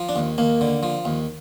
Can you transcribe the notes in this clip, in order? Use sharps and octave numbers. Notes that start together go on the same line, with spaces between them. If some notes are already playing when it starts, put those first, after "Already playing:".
Already playing: F3
D4
D#2
D#2 A#3
D3
F3
D#2